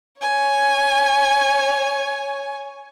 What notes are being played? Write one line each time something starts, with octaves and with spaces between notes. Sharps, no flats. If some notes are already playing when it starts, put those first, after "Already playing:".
C#5 G#5